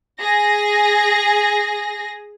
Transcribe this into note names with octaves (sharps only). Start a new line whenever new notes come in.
G#4 A#6